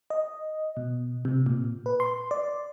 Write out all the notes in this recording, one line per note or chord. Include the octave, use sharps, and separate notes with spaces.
D#5
B2
C3
A#2
B4
C6
D5